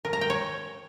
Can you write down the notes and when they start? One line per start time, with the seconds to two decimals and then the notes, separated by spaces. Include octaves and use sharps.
0.05 A#4
0.13 A#5
0.21 G5
0.30 C#5